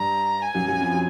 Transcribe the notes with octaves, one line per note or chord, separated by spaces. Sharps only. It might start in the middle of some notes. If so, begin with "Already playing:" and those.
Already playing: G2 G3 A#5
G#5
F#2 F#3
F#2 F#3
F2 F3
F#3